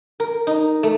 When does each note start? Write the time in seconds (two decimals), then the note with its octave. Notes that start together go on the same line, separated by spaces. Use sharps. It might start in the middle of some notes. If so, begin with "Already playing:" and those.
0.20 A#4
0.47 D#4
0.83 A3